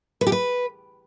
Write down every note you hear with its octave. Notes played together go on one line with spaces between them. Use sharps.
B4
G4
B4